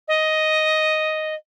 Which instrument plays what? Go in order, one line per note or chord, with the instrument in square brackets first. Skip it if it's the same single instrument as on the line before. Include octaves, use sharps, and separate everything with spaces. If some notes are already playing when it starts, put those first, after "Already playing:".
[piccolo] D#5